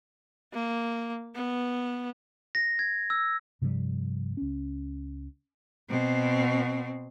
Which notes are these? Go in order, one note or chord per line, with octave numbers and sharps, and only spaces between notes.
A#3
B3
A#6
G#6
E6
G2 C3 F3 G3
C#2 C#4
B2 C4